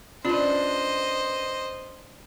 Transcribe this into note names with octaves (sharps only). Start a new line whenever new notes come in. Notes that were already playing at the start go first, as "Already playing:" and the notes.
C#4 D4 F4 B4 C5 D#5